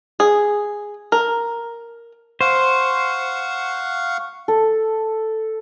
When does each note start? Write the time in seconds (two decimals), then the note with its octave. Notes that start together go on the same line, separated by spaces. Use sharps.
0.20 G#4
1.12 A#4
2.41 C5 F5 F#5 C#6
4.48 A4